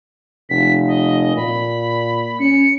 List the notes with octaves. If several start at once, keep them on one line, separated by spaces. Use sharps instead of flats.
F1 B6
D#5
A#2 B5
C#4 C#7